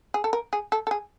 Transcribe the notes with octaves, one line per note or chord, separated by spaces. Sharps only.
G#4
A4
A#4
G#4
A4
A4
G#4